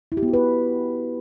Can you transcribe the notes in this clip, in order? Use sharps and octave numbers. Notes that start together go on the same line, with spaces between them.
E4
G4
B3
F#4
B4